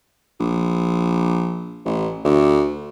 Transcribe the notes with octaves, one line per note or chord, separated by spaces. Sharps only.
A#1
A1
D2